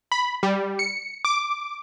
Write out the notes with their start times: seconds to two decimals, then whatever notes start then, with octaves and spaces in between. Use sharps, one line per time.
0.12 B5
0.43 G3
0.79 C#7
1.25 D6